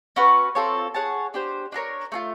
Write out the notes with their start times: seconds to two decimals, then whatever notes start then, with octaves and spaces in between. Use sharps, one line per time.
0.16 C#4 F#4 B4
0.55 C4 F4 A4 C#5
0.94 G#4 C#5 F#5 A5
1.34 D4 G4 C5
1.72 D4 F4 A#4 C#5
2.12 A3 D4 F4